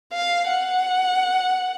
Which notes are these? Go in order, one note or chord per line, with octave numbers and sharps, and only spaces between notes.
F5
F#5